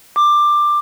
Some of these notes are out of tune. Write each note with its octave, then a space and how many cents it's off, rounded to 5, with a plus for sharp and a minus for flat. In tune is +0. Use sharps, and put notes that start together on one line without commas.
D6 +15